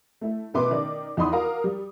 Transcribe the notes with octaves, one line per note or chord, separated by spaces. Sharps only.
A3 E4
A1 B2 B4 E5 C6 D6
D#3 D#4 D5
E2 D#4 E4 B5 C6 D#6
F#4 A#4 F5 A#5
G3